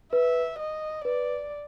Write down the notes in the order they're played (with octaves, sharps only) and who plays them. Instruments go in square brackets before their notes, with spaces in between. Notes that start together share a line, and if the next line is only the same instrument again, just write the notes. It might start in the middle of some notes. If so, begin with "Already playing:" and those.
[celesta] B4 [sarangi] E5
[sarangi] D#5
[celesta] B4 [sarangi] D5